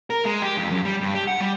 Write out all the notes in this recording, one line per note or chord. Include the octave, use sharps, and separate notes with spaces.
A#4
G#3
G4
F2
F#2
G3
G2
G4
F#5
G3